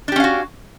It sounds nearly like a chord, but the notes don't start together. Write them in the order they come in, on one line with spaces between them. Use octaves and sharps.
D4 G4 C#4 F5 F#4